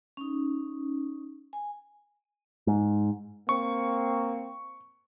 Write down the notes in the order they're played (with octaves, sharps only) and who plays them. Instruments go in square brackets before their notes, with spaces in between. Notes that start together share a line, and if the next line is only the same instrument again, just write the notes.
[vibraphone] C#4 D#4
G#5
[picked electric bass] G#2
[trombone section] A#3 C4 [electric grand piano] C#6